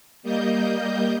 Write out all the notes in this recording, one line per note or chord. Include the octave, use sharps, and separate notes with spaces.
G3 A#3 D#5 G6